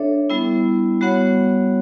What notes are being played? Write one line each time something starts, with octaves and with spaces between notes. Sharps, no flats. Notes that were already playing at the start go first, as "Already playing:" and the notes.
Already playing: D4 A4 C#5 E5
G3 B3 E4
G3 B3 F#4 C#5 F#5